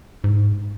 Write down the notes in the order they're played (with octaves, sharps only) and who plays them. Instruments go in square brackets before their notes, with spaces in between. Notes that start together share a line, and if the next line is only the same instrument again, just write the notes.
[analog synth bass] G#2